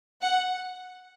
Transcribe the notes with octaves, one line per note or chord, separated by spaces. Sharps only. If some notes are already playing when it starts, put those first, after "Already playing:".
F#5